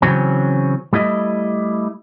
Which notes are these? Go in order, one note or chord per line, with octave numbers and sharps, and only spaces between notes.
C#3 E3 F#3 C4 C#4
G3 A3 E4 D#5